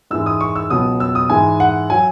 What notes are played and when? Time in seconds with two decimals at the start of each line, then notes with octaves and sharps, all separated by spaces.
0.11 G#2 E3 G#3 E6
0.26 D#6
0.41 C#6
0.56 E6
0.70 C#2 B2 F#3 D#6
1.00 E6
1.15 D#6
1.30 G#2 E3 G#3 G#5
1.60 F#5
1.90 F#3 G#5